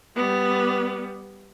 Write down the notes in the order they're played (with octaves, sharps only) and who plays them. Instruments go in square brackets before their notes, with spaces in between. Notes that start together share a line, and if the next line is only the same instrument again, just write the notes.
[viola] G3 B3